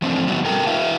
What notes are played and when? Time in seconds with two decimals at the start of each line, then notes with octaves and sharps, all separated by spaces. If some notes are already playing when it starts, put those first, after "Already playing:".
0.02 E3 F3 A3 C4 D4
0.27 D3 G3 B3 C4 F#4
0.45 A4 A#4 G5
0.67 E4 F#4 B4 E5 F5